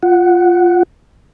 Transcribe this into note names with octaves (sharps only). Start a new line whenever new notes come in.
F4 F#5